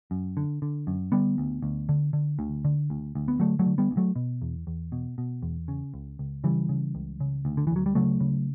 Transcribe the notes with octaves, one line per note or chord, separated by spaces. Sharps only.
F#2
D3
D3
F#2
D3 G3 B3
D2
D2
D3
D3
D2
D3
D2
D2
B3
D3 F#3 A3
F#3 A3
D3
G3 B3
D2
F#3 A3
B2
E2
E2
B2
B2
E2
C#3
C#2
C#2
C#3 E3 G3
C#3
C#2
C#3
D2
D3
E3
D2
F#3
G3
C#3 F#3 A3
C#3